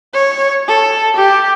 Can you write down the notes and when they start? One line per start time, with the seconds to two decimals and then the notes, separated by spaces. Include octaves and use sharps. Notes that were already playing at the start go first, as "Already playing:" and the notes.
0.13 C#5
0.68 A4
1.16 G4